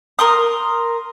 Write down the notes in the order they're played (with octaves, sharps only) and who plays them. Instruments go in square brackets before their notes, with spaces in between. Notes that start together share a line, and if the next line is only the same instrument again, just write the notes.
[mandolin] A#4 C6 D#6